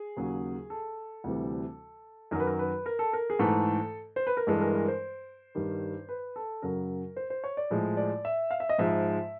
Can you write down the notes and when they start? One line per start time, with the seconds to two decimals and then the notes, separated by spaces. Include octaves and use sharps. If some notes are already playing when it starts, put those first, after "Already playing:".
Already playing: G#4
0.17 D#2 C#3 F#3
0.70 A4
1.24 D2 C3 E3 G3
2.31 F#2 D#3 F#3 A#4
2.40 B4
2.47 A#4
2.59 B4
2.86 A#4
2.99 A4
3.13 A#4
3.30 G#4
3.39 G#2 E3 A3 A4
4.16 C5
4.27 B4
4.37 A#4
4.47 G2 E3 G#3 A4
4.61 A#4
4.75 A#4
4.88 C5
5.55 G2 D#3 G3
6.09 B4
6.36 A4
6.62 F#2 C#3 F#3 A#4
7.16 C5
7.30 C5
7.44 C#5
7.57 D5
7.70 A2 F3 G#3
7.97 D5
8.25 E5
8.51 F5
8.60 E5
8.69 D#5
8.78 G#2 F3 G#3 E5